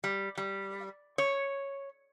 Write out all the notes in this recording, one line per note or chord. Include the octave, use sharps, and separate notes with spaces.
G3
G3
C#5